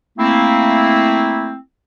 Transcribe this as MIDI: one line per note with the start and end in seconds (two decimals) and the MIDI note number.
0.18 1.56 57
0.18 1.56 58
0.18 1.56 60
0.18 1.56 64